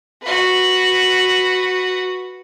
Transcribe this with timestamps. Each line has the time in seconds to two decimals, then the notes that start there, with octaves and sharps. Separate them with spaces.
0.22 F#4 B4